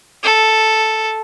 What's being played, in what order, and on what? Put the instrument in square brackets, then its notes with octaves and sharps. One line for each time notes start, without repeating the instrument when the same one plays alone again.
[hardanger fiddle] A4